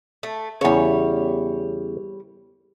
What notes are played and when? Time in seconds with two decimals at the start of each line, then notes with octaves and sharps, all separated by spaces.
0.23 A3
0.61 E2 C#3 G3 C#5